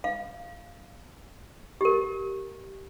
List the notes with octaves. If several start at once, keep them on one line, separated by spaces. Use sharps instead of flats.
F5
G4 A#4